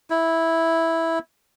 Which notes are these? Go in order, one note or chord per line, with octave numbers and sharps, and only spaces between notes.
E4